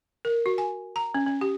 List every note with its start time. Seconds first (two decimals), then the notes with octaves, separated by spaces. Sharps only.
0.25 A#4
0.46 F#4
0.58 G#5
0.96 A#5
1.14 C#4
1.26 C#4
1.41 G4